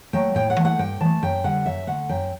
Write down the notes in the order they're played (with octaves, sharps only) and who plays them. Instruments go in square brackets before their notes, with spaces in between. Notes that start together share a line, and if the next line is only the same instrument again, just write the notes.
[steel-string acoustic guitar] F#3 A3 G5
A2 G5
F#5
E3 A3
F#5
G2 G5
E3 A3 A5
F#2 G5
D3 G3 F#5
F#2 E5
D3 A3 F#5
F#2 G5